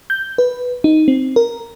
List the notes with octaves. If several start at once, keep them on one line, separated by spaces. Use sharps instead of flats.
G6
B4
D#4
C4
A#4